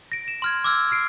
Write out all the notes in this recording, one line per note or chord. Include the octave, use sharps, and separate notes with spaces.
A#6 D7
E7
C6 F6 G#6
D6 E6 F6 G#6
F6 C7 D7